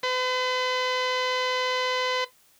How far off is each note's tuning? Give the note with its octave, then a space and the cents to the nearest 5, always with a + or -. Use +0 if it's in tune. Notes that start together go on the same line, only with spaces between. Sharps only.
B4 +45